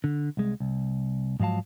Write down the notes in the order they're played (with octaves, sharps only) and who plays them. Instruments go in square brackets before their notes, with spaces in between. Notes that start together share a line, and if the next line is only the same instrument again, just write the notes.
[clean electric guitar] D3
C2 G#3
C2
G#2 F3 F#3 F5 A5